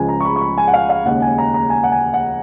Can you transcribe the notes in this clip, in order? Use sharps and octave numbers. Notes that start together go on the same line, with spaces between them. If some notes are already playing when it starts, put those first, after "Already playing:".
Already playing: C#2 C#3 F3 G#3 G#5
A#5
C#6
B5
C#6
B5
G#5
F#5
F5
F5
D#2 C#3 G#3 C#4 F#5
G#5
A#5
A#5
G#5
F#5
G#5
F#5